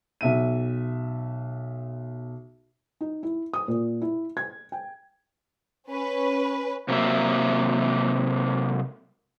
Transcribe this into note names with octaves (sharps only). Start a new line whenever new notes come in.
B1 E5 D#7
D#4
E4
D#6
A#2
E4
G#6
G5
C#4 B4
C3 F#3 A#3 E5